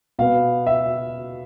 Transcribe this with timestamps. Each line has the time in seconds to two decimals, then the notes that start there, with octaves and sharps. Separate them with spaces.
0.19 B2 B3 F5
0.67 E5